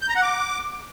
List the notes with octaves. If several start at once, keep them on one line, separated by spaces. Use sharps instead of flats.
G6
A#5
F#5
D6